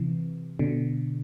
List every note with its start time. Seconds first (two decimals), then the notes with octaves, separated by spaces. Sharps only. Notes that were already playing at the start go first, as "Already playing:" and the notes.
Already playing: C3 E3
0.59 B2 D3